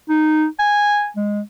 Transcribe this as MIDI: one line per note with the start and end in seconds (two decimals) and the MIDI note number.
0.09 0.45 63
0.59 1.08 80
1.16 1.41 56